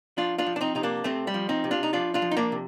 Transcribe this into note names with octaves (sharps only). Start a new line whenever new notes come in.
F3 D4 F4
D4 F4
F3
D4
C4 D#4
C3 D#4
A#3 D4
C3 A3 C4
G3
F3
C4 D#4
C3
D4 F4
D#4
F3 D4 F4
D4 F4
F3
D#4
A#3 D4
C3